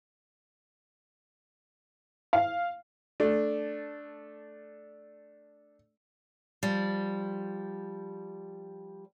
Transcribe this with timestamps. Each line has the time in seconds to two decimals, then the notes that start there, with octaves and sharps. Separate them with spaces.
2.33 F5
3.20 A3 D4
6.63 F3 G3